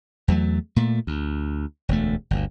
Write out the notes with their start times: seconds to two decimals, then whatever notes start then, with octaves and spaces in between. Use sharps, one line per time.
0.28 E2 F#3 A3
0.76 A#2 A3
1.07 D2
1.89 E1 D2 A3
2.31 G1 D2